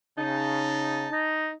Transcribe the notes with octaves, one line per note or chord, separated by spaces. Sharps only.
C#3 D#4 A5
D#4